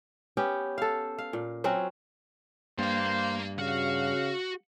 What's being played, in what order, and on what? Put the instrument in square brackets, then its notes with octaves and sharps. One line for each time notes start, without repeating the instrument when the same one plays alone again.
[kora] B3 C#4 G4
A4 F5
F5
A#2
F#3 C4 C#4 F#4
[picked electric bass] G2 [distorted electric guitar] A#3 F5 [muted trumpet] C5
[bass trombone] C#3 [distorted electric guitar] F#4 [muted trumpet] F5